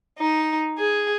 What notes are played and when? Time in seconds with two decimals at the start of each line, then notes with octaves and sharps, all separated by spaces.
0.19 D#4
0.78 G#4